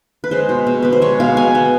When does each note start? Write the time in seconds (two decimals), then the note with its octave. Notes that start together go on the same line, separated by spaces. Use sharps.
0.24 B4
0.31 G#3 C5
0.49 B2
0.67 B2
0.83 B3 B4
0.92 C5
1.02 G#3 C#5
1.20 B2 F5
1.37 B2 G#5
1.55 B3